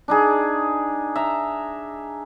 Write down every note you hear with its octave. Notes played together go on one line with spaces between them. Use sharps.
D4 D#4 G#4
E5 A#5